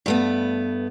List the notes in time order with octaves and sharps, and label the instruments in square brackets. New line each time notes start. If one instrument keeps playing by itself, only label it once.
[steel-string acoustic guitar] G2 A3 B3